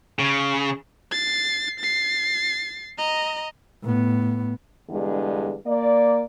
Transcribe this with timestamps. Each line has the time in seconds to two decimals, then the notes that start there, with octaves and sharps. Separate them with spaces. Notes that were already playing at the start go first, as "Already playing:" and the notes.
0.19 C#3
1.11 A6 C7
1.80 A6 C7
2.98 D#5 A#5
3.82 A2 B3
4.89 E2 G2 D3 G#3
5.66 A#3 D5